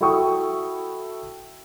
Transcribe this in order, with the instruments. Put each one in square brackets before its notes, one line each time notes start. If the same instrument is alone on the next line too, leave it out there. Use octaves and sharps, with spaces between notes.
[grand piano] E4 F#4 A4 G5 C#6 D#6